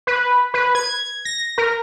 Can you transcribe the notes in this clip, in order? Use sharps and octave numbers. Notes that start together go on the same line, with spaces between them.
B4
B4
G#6
A#6
A#4